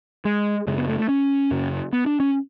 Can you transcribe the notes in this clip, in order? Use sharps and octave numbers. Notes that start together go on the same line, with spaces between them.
G#3
F#2 C#3 G#3
B3
A3
A3
C#4
F#2 C#3
B3
D4
C#4